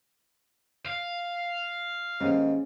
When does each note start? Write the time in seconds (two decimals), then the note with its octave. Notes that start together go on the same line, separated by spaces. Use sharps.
0.86 F5
2.20 D#2 G#2 C#4